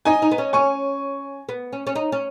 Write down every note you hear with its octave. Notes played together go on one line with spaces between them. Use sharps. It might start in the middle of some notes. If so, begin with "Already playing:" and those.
D#4 D#5 G#5
D#4
B3
C#4
C#4 G#5 C#6
B3
C#4
C#4
D#4
C#4